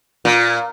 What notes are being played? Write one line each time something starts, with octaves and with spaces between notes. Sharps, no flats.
A#2